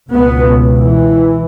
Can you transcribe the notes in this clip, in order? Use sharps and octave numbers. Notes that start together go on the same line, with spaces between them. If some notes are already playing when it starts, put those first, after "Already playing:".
C#2 B2 B3
E3